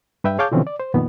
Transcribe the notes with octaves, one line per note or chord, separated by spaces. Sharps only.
G2 B4 E5 G5
G#4 C#5 F5 A5 D6 G6
B2 D3 E3 F3 C4 C#4
D5
C5
F2 A#2 D#3 B3